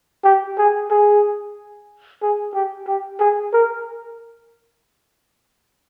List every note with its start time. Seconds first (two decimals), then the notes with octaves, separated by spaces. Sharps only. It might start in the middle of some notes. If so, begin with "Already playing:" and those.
0.24 G4
0.58 G#4
0.91 G#4
2.22 G#4
2.54 G4
2.87 G4
3.20 G#4
3.53 A#4